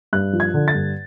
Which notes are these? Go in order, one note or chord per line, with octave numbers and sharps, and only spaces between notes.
G2 F#6
F3
G#6
D3
A6
G2